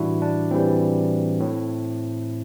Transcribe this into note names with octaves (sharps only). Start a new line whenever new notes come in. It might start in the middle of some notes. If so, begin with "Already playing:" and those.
Already playing: A2 E3 G3 D4 E4 F#4
D4
A2 E3 G3 C4
A2